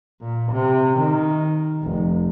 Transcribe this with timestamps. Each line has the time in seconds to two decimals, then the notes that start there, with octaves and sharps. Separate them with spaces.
0.21 A#2
0.52 C3
0.98 D#3
1.83 F1